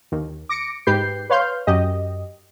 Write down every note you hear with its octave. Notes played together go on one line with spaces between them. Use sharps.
D#2
D6 A#6 C#7 D7
G#2 G4 B4 G6 C7
B4 C#5 F5 C6 F6 G6
F#2 G4 D#5